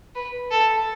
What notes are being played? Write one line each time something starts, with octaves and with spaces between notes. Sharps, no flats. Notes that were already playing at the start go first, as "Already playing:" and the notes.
B4
A4